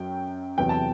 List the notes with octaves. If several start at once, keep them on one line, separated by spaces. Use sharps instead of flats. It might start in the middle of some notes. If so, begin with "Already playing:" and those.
Already playing: F#2 F#3 G5
E2 C3 F#3 G5
A5